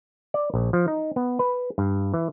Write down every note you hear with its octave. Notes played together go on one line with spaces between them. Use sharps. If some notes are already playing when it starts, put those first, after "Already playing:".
D5
A#1
F3
D#4
B3
B4
G2
E3